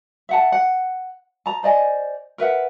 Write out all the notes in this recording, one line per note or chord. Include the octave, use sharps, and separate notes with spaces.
E5 F#5 A5
F#5
A5 A#5
C5 D5 D#5 G#5
A#4 B4 E5 F#5